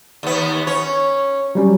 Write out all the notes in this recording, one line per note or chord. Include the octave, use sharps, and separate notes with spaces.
D#2 B3
C#4 C#5
F#3 G3 C#4